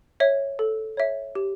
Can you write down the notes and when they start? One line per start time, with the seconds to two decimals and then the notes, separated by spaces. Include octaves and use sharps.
0.20 C#5 E5
0.59 A4
0.97 C#5 E5
1.35 G4